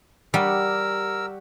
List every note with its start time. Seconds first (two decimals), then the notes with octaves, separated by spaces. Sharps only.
0.34 G3 G4 A#4 F#5 C#6 E6